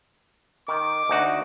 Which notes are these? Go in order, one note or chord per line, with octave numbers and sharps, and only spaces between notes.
D#3 D6
D2 D#4 F#4